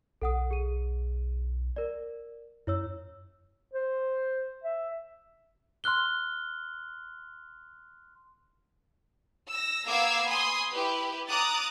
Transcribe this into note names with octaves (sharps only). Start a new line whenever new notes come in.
B1 A4 F#5 D#6
G#4 D#7
A#4 D5
F#2 E4 C#5 E6
C5
E5
C6 F6 F#6 G7
E6 A#6
A#3 B3 F5 D6 E6 G#6
G#5 B5 C6 D#6
E4 G4 B4
A#5 D6 D#6 F#6 A6